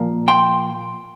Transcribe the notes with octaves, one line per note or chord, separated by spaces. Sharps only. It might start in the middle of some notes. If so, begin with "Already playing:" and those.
Already playing: A#2 F3 A#3
G5 C6